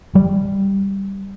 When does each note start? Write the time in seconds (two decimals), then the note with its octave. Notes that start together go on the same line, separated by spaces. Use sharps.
0.15 G3